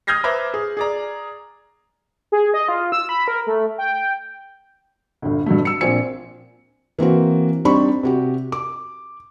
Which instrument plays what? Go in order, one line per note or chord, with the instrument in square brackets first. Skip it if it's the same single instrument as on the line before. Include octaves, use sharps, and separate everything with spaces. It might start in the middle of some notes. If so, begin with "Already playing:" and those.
[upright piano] D#6 F6 G6 G#6 A#6 C7
B4 C5 E5 A#5 D6 G#6
G#4
G#4 D5 A#5
[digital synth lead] G#4
D#5
F4
E6
B5
A#4
A3
G5
[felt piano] G1 D2
G2 F#3 A3
E6 C#7
A#1 A#2 C4 G#5 C#7
E3 A#3 C4 F#4
G3 C4 D4 D#4 B5 C#6
C3 F#4 G4
D6